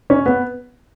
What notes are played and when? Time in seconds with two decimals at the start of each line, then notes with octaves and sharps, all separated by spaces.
0.10 C#4
0.26 B3